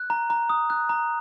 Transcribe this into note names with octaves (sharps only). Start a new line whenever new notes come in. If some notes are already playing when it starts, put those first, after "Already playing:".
Already playing: F#6
A#5
A#5
D#6
F#6
A#5